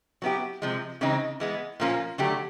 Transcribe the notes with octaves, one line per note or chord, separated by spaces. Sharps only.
F#3 B3 E4 G4
C3 F3 G#3
C#3 E3 G#3 C4 D#4
E3 G#3 B3
A#2 F3 A#3 C#4 F4
D3 F#3 A3 D4 G4